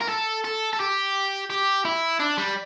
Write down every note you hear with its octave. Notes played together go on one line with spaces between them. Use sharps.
A#4
A4
A4
A4
G4
G4
E4
D4
G3